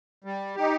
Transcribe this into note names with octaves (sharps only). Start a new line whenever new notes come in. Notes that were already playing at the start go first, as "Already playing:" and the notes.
G3
D#4 G4